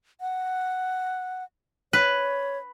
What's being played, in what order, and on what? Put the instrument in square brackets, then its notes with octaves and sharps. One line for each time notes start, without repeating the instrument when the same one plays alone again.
[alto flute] F#5
[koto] B4 [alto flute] C#5